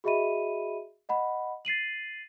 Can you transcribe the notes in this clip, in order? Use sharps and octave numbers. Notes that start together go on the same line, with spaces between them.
F#4 G#4 D#5 E5 B5 D#7
D#5 F#5 B5
A6 C7 D#7 F#7